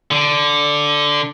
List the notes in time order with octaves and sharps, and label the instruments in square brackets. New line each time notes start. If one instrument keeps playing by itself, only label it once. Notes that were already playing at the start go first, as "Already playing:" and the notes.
[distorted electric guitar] D3